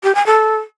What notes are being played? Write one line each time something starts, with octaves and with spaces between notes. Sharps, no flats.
G4
G#5
A4